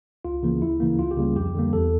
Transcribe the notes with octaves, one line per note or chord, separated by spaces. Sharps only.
C#2 F4
C#3 E3 A#3
D2 E4
C#3 E3 A#3
C#2 F4
G4
C#3 G3 A#3
F2 G4
D3 G3 A#3
E2 A4